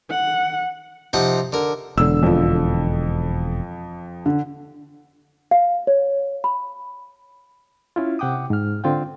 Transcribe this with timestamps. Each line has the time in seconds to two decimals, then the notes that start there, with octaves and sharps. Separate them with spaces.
0.10 F#5
1.13 C3 F3 D#4 F#5
1.53 D3 A#4
1.98 E1 D3 E6
2.23 F2 F3
4.26 D3
5.51 F5
5.87 C#5
6.44 B5
7.96 C#4 E4 F4
8.19 C3 F#5 G5 D6 D#6
8.50 G#2 F6
8.84 D3 C4 F4 F5 G5